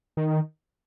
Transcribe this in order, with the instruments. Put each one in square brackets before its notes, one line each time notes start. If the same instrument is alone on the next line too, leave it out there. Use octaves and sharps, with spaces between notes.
[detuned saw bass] D#3